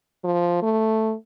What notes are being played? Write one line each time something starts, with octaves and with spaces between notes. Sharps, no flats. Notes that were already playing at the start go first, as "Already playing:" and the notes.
F3
A3